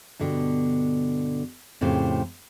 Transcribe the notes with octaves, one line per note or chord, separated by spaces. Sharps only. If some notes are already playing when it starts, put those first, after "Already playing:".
G2 B2 D3
F2 A2 C#3 C4 G4 C5